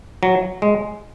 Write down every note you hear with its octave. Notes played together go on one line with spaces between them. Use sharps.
F#3
G#3